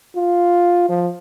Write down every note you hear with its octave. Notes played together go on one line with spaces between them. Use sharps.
F4
F3